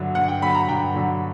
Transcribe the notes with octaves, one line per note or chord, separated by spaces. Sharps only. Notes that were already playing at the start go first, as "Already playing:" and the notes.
Already playing: G2 D3 F#3 E5
G2 F#5
G5
D3 F#3 B5
A#5
G2 G5
D3 F#3